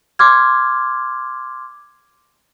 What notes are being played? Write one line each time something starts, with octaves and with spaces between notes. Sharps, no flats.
C6 D6 F6 G#6